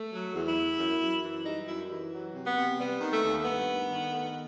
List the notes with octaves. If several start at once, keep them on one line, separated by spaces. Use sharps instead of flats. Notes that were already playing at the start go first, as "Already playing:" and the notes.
Already playing: A3
F#3
E2
E4
E2
F#2
F#2
E3
G3 D#4
F#2 E4
E3
F#3
C3
B3
C3
G3 B3
D#3
A3
D#2
G2 B3
D#3
D#3
A3